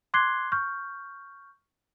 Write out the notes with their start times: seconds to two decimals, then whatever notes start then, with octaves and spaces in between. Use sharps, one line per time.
0.14 C6 D6 F#6 G#6 C7 G7
0.52 C#6 F6 G6